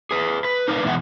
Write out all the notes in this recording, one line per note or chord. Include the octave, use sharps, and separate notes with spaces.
G#4 B4
B4
D#4 A#4 B4 D5 F5
E2 B2 E3 G#3 E5 F#5